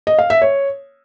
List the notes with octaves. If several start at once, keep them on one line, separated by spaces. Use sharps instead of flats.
D#5
F5
E5
C#5